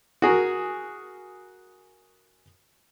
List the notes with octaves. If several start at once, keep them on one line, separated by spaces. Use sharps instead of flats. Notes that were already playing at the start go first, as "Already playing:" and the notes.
F#4 G#4 A#4